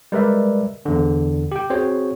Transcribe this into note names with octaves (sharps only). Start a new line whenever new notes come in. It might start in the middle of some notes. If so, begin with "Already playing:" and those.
G3 G#3 A#4 B4 D5 E5
E2 D3
G4 G5
C4 F#4 G#4 C5 C#5